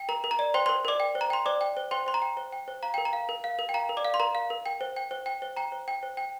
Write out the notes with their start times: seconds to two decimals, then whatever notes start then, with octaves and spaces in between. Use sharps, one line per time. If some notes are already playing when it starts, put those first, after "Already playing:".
Already playing: G5
0.09 A#4 A#5
0.24 A#4
0.31 A#5
0.39 D5
0.54 C5 G5 C6
0.66 C5 C6
0.69 A#4
0.85 A#4 D5 D6
1.00 G5
1.15 C5
1.21 A#5
1.30 G5 C6
1.46 C5 D5 D6
1.61 G5
1.77 C5
1.91 C5 G5 C6
2.06 C5 C6
2.14 A#5
2.22 G5
2.37 C5
2.53 G5
2.68 C5
2.83 F5 A#5
2.94 A#4 G5
3.05 A#5
3.13 F5
3.29 A#4
3.44 F5
3.59 A#4
3.69 G5
3.74 F5 A#5
3.89 A#4
3.97 D5 D6
4.04 F5
4.14 C6
4.20 A#4 A#5
4.35 F5
4.50 A#4
4.66 G5
4.81 C5
4.96 G5
5.11 C5
5.26 G5
5.42 C5
5.57 G5 A#5
5.72 C5
5.88 G5
6.03 C5
6.17 G5